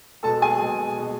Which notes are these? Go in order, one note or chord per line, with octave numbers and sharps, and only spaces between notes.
B2 G#3 A4 A5
G#4 G#5
B2 G#3
B2 G#3